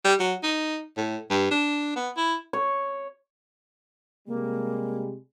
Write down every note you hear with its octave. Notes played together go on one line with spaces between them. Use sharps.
G3
F#3
D#4
A2
G2
D4
B3
E4
C#5
C3 G3 G#3 A#3